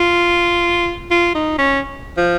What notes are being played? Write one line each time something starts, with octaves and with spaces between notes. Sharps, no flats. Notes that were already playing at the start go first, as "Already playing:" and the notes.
Already playing: F4
F4
D#4
C#4
F3